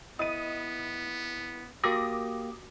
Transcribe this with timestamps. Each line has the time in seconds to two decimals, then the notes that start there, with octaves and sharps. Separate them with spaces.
0.19 B3 E4 D#5 D#6 D#7
1.84 A#3 F#4 G4 A#4 D6 D#6 A#6